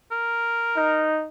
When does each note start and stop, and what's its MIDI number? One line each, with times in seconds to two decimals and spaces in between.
0.12 1.07 70
0.76 1.29 63